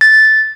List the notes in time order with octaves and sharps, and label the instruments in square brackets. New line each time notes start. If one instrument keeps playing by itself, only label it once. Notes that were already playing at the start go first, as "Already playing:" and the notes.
[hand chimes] A6